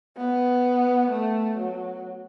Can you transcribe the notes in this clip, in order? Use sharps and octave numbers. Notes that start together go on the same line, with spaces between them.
B3
A3
F#3